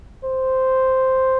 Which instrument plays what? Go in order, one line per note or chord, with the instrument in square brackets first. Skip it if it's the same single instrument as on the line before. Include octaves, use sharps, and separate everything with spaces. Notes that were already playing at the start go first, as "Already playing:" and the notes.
[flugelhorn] C5